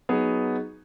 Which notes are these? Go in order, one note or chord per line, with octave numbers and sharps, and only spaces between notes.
F#3 B3 D#4 G#4